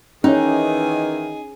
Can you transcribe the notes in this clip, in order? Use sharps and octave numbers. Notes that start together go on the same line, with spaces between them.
D#3 E3 C#4 D#4 G#4 C#5 G#5